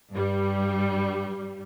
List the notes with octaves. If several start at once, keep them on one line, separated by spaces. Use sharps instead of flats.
G2 G3